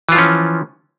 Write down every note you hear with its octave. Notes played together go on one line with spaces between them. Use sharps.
E3 F3 C#4 F4